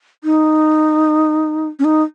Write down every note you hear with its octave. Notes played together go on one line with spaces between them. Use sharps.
D#4
C#4
D#4